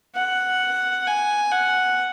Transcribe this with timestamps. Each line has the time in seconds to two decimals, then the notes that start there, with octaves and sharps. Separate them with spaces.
0.15 F#5
1.07 G#5
1.52 F#5